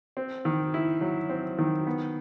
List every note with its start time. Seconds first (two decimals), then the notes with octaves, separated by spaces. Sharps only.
0.17 C4
0.45 D#3
0.74 E4
1.01 F#3
1.29 C4
1.59 D#3
1.87 B3